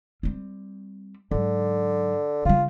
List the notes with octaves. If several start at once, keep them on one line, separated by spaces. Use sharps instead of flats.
G3 C4
G#2 D3 F#3
C#3 G3 F4